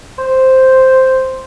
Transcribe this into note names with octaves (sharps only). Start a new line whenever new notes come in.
C5